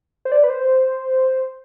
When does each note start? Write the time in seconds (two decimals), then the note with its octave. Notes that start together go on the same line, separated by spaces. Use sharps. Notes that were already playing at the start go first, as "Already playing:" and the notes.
0.25 C5
0.32 D5
0.43 B4
0.50 C5